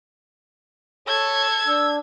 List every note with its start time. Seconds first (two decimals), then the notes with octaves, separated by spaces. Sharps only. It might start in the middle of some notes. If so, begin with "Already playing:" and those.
1.08 A4 C#5 G#6
1.67 D4 E6